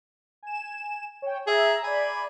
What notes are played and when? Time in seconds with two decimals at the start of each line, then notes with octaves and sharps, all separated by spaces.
0.43 G#5 E7
1.22 C#5 G5
1.47 G#4 E5 A#5 E6
1.84 D5 G#5 B5